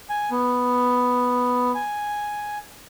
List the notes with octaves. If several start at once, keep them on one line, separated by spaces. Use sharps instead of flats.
G#5
B3
G#5